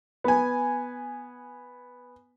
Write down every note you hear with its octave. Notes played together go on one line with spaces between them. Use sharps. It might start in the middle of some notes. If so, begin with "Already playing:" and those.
B3 G#5